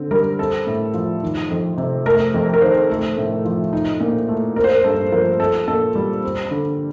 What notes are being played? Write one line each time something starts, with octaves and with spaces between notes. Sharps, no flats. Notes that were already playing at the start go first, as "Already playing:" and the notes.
Already playing: D3 C4
G3 A#4
C4 A4
A2
F3
D#3
F2
C3
A3 A#4
F2
A#4
D#3 C5
A3 A4
A2
F3
D#4
A#2
A3
C4 A#4
C5
A#4
G2 A4
F3 A#4
C4 A4
A#2 A4
G3
C4
D3